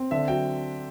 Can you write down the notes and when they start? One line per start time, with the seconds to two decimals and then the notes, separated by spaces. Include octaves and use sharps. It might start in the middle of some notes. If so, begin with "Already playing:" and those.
Already playing: C4
0.11 D3 E5
0.28 F#3 G5